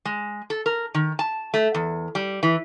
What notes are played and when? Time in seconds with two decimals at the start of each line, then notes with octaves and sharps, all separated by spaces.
0.05 G#3
0.50 A4
0.66 A#4
0.95 D#3
1.19 A5
1.54 A3
1.75 E2
2.15 G3
2.43 E3